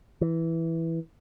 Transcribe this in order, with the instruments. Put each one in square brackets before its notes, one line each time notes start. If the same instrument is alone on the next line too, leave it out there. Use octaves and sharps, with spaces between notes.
[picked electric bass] E3